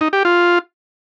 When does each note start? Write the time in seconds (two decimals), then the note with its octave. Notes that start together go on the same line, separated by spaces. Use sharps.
0.01 D#4
0.13 G4
0.25 F4